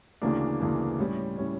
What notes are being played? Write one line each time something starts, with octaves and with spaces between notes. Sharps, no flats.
D2 C#3 E3 A#3 D4
D2 C#3 E3 A#3 D4
A2 G3 C#4
A2 G3 C#4